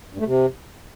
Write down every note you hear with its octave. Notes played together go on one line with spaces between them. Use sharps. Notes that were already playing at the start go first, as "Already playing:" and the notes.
G2
A3
C3